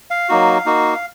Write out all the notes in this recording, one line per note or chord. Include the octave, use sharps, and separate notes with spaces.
F5
F#3 A#3 D#4 F#4
A#3 D#4 F#4